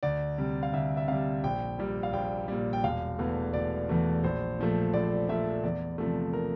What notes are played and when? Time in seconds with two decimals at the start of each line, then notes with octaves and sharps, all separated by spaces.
0.03 D2 D5
0.38 C3 G3
0.63 F5
0.73 D2 E5
0.97 E5
1.08 C3 G3 F5
1.44 A#1 G5
1.79 A#2 G3
2.03 F5
2.13 A#1 G5
2.48 A#2 G3
2.73 G5
2.83 E1 F5
3.19 E2 E3 A3
3.53 E1 D5
3.89 E2 E3 A3
4.24 A#1 C5
4.58 A#2 F3 A3
4.94 A#1 D5
5.29 A#2 F3 A3 E5
5.63 E2 D5
5.98 C3 F3 A3
6.33 A#4